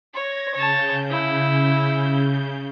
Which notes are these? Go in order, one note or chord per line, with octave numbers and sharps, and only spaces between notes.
C#5 G#6 A#6
C#3 C#5 A5 G6
E4